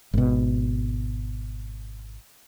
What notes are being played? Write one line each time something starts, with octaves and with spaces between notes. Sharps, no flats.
G#1 B2